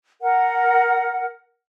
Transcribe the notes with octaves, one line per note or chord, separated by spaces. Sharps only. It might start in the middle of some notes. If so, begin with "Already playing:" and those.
A#4 F#5